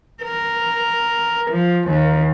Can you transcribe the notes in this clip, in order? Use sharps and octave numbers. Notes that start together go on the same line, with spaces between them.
A#4
F3
D#2